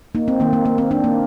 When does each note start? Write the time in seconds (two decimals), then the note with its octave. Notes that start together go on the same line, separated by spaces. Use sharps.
0.15 A#3 D#4
0.28 C4
0.40 D#3 A#3
0.53 A#3
0.66 A#3
0.78 C4
0.91 A#3 D4
1.04 A#3